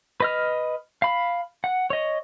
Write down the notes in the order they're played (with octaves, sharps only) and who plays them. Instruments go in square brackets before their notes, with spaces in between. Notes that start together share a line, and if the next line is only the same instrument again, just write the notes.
[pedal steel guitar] B4 D#5 F6
F5 B5
F#5
C#5 D#5